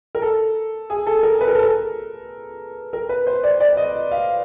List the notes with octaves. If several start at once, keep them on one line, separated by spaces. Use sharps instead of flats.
A#4
A4
G#4
A4
A#4
B4
A#4
A4
A#4
A#4
B4
C5
D5
D5
D#5
F5